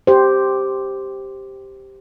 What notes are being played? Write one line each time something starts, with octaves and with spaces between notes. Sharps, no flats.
G4 C5